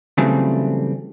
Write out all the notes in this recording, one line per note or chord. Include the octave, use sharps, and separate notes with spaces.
C#3 E3 F#3 G3 A3 C4